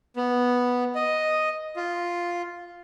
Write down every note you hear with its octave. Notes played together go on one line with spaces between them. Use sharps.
B3
D#5
F4